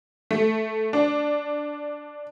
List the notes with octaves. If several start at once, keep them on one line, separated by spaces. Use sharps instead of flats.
A3
D4